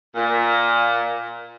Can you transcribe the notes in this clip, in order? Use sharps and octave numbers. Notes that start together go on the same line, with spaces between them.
A#2